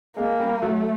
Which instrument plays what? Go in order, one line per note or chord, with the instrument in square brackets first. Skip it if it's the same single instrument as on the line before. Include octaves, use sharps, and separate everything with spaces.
[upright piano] G#3 G#4 [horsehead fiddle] A#3
[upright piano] G3 G4
[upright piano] F#3 F#4 [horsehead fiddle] A3